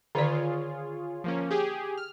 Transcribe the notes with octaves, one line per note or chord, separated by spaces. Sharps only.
D3 D#3 F4 G#4 C#5 D5
F3 A#3 C#4
G4 G#4
F6